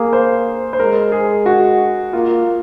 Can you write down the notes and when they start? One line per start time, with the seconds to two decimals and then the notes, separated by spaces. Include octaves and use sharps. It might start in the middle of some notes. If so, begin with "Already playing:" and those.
Already playing: A#3 G#4
0.13 C5
0.73 C5
0.80 G#3 A#4
1.12 G#4
1.46 F#4
2.13 A#3 F4